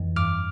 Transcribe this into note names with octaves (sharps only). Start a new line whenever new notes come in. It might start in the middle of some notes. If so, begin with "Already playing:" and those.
Already playing: F2 E3
G2 D6 F6